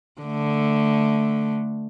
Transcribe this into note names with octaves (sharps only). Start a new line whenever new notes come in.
D3 A3